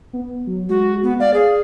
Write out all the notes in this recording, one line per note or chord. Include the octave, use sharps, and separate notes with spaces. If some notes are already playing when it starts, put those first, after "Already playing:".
B3
F#3
G#3 F#4
B3
D5 F5
G#4